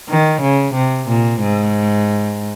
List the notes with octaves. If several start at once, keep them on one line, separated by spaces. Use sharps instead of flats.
D#3
C#3
C3
A#2
G#2